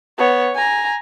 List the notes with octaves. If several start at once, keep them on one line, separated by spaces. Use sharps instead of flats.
B3 C#5
G#5 A#5